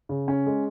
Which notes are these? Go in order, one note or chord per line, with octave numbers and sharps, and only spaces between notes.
C#3
C#4
G#3